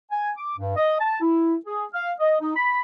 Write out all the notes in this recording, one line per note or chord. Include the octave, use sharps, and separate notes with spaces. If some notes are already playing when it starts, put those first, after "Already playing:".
G#5
D6
G2
D#5
A5
E4
G#4
F5
D#5
D#4
B5